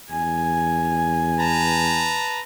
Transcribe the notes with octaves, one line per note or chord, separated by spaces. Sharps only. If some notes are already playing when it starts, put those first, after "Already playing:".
E2 G#5
B4 A5 A#5